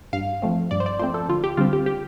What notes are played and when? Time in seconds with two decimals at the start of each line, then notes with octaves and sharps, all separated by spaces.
0.13 G2 F5
0.42 F3 A3 C4
0.71 G2 D5
0.80 C5
0.86 D5
0.99 F3 A3 C4 C5
1.14 A4
1.28 D2 F4
1.44 G4
1.57 D3 G3 C4 F4
1.73 G4
1.86 G4